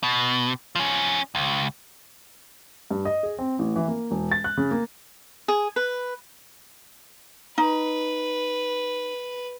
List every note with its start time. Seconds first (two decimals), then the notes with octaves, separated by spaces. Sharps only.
0.03 B2
0.76 F3 C#4
1.35 C#2
2.91 G2
3.05 D#5
3.23 G#4
3.39 C4
3.59 A1
3.76 E3
3.88 A#3
4.11 E1
4.32 A6
4.44 F#6
4.57 C#3
4.71 A#3
5.48 G#4
5.76 B4
7.58 D#4 B4